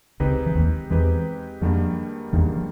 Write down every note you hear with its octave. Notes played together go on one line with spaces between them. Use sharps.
C#2 C#3 G#3 C4 D#4 G4 B4
E3
D#2 D#3
E2 E3 G#3 C4 D#4 G4 B4
F2 G#2 D#3 F3 G3 A#3 D4
E2 G#2 D#3 E3 G3 A#3 D4
F3